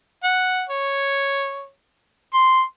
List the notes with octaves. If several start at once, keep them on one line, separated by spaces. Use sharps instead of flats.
F#5
C#5
C6